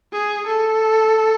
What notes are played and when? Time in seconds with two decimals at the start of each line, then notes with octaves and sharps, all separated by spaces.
0.13 G#4
0.47 A4